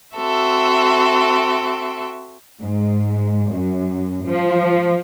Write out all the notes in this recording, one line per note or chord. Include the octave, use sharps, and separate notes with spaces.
C4 F#4 A4 E5
G#2
F#2
F3